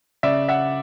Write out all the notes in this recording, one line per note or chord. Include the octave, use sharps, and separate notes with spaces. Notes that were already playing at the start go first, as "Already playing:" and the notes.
C#3 D5 E5
E5 F#5